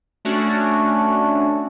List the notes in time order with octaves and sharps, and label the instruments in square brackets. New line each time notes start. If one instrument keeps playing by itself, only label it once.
[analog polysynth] A3 C#4 D4 F#4